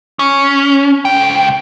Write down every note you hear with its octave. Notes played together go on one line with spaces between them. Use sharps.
C#4
C#2 G5